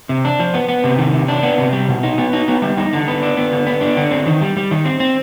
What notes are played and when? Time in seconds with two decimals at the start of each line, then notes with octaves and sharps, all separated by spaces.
0.09 C3
0.25 D4
0.40 F3
0.54 B3
0.69 B3
0.84 C3
0.98 D#3
1.13 C3
1.28 D4
1.43 B3
1.58 C3
1.73 G3
1.89 B2
2.03 D#4
2.18 B3
2.33 D#4
2.48 B3
2.62 G3
2.77 D#4
2.93 D3
3.08 B3
3.23 D4
3.37 B3
3.52 D3
3.67 B3
3.81 D4
3.97 D3
4.11 C4
4.26 D#3
4.41 G3
4.57 G3
4.71 D#3
4.85 C4
5.00 C4